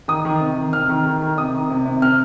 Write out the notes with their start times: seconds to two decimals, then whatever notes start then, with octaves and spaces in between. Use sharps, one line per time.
0.08 D#3 D#6
0.25 D#3
0.40 C3
0.57 D#3
0.73 C3 F6
0.89 D#3
1.06 D#3
1.22 D#3
1.38 C3 D#6
1.54 D#3
1.70 C3
1.85 C3
2.02 C3 F6